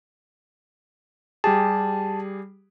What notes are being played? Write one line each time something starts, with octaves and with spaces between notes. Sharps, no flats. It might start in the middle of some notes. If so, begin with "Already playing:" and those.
G3 G4 G#4 A5